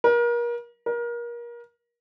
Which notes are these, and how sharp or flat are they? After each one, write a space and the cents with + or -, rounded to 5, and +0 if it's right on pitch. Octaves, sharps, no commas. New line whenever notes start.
A#4 +35
A#4 +30